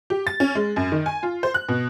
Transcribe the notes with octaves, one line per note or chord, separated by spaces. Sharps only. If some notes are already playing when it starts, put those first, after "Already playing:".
G4
A6
C#4
G#3
F#2
D#3
G#5
F4
C5
F#6
B2